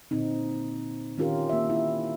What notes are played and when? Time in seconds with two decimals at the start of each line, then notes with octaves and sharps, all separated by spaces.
0.11 A#2 D3 C4 D#4
1.18 D#3 C#4 F4 G4 A#4
1.49 A#3 E5
1.70 E4